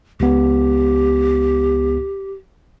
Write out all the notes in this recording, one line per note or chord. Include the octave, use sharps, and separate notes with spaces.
C#2 B3 G4